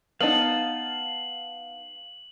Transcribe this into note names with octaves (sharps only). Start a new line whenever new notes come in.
B3 D#4 F5 A5 F#7